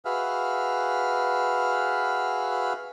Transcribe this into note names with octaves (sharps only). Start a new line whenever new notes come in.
F#4 G#4 B4 E5 F5 F6